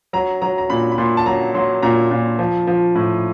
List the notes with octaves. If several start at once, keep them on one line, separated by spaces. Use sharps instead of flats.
F#3 A#5
F#3 A#5
A#5
A#2 B5
B5
A#2 C6
A5
F#3 A#5
F#3 C6
A#2 A#5
A#2
F3
F3
A2